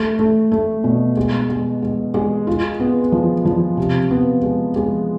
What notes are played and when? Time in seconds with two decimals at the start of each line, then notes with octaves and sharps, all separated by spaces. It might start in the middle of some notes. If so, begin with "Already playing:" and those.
Already playing: A3
0.19 A3
0.52 A3
0.84 B2
1.17 G#3
1.50 G#3
1.82 G#3
2.14 G#3
2.47 F4
2.80 B3
3.12 F3
3.45 F3
3.77 C3
4.11 B3
4.43 G#3
4.76 G#3